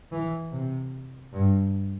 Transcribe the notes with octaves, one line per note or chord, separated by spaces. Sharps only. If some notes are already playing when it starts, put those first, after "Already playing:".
E3
C3
G2